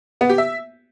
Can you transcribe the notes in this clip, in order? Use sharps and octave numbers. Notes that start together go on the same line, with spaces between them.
B3
G4
E5